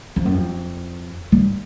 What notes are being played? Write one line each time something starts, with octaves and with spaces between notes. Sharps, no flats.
F2
F#2
F2
G2